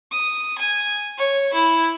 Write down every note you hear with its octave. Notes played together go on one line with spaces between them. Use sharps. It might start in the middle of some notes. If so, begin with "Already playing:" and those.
D#6
G#5
C#5
E4